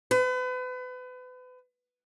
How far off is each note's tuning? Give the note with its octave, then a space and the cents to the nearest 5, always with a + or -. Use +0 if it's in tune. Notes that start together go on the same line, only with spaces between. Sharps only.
B4 +35